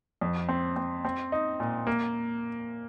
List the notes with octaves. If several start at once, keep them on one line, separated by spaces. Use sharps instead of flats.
F2
C4
C4
C4
D#4
A#2
A#3